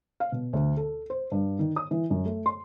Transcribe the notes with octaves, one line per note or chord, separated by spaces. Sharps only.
F5
B2
D2
A4
C5
G2
D#3
D#6
E3
F#2
A3
C6